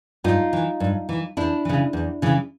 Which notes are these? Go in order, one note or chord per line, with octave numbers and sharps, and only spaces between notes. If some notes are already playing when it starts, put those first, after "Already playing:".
G2 D#4 F4
E3
G2
E3
E2 D4 E4
C#3 E3
E2
C#3 E3